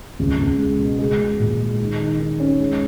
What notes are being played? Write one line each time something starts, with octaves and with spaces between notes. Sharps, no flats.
C#2
C#2
G#3
B2
G#3
G#3
A#2
G#3
D#3
D#3
D#3
C#4
G#3